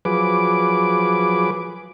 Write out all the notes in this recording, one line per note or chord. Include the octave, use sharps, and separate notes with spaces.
F3 F#3 G#4 B4 D6